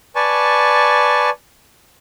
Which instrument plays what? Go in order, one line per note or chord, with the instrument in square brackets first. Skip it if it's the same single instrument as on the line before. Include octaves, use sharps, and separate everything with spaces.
[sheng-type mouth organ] B4 D5 G#5 A5 C#6